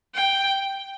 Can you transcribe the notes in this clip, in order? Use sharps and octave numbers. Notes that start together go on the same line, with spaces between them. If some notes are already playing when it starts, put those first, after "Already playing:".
G5